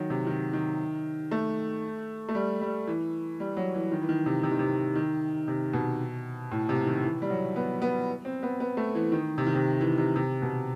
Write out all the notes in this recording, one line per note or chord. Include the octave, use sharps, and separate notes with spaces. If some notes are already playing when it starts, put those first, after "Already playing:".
Already playing: D#3 F#3
C3
D#3
D#3
A3
A3
G3
G3
E3
G3
F#3
E3
D#3
E3
D#3
C3
C3
D#3
C3
D#3
C3
B2
A2
C3
D#3
E3
G3
F#3
B3
B3
C4
B3
B3
A3
E3
D#3
C3
D#3
C3
E3
C3
C3
B2